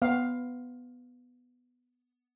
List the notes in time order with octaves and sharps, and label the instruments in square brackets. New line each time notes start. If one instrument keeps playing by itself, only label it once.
[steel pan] B3 F5